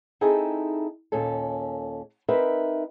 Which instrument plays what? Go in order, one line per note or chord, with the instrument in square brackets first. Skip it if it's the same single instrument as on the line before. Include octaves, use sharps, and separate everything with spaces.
[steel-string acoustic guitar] C4 D#4 E4 G#4 A4
D#2 A#2 C#4 A4
C4 D#4 A#4 B4 E5